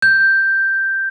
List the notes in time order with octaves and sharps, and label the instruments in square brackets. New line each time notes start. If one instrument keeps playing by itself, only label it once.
[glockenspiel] G6